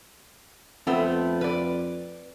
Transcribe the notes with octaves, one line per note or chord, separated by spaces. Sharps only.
F2 A3 B3 C4
B4 D5